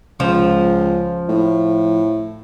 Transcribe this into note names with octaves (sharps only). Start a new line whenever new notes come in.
C#2 F3
A2